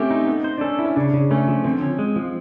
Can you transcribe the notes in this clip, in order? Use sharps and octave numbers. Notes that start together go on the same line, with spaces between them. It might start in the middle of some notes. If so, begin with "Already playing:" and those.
Already playing: A3 C4 C#4 G4
D#4
B3
C5
D4
C#4 A4
E4
C#4
C#3 D4
C#3
A3 C#4
F3
D3 C4
C#4
G#3
F3